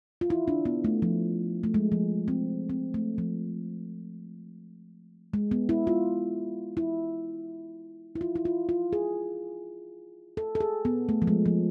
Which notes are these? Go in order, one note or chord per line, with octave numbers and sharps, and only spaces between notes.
F4
E4
D4
B3
A3
F3
A3
G#3
F3
C4
C4
A3
F3
G#3
B3
E4
F4
E4
E4
F4
E4
F4
F4
G#4
A4
A4
G#4
B3
A3
F3
G#3
F3